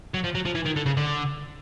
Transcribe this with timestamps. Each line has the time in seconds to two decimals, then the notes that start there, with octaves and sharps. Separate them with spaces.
0.14 F#3
0.24 F3
0.35 F#3
0.45 F3
0.55 E3
0.66 D#3
0.76 D3
0.86 C#3
0.97 D3